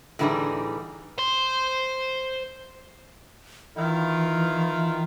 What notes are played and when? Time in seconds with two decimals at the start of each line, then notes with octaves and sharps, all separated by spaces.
0.19 A2 D3 E3 G3 D#4 G#4
1.18 C5 C6
3.76 D#3 E3 E4 F4